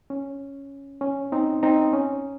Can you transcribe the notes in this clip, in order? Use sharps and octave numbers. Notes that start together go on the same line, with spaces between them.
C#4
C#4
C4 D#4
C4 D#4
C#4